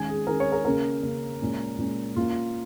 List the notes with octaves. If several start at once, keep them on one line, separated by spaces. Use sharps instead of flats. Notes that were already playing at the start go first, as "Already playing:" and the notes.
Already playing: D#3 G#3 C#4 G#5
G#4
D#3 G#3 C#4 A#4
C#5
A#4
C#3 A#3 C#4 A#4
C#3 A#3 C#4
A#2 G#3 C#4
A#2 G#3 C#4
A#2 A#3 C#4 F4